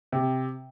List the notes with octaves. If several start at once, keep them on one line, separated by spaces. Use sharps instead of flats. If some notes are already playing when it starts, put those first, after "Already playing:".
C3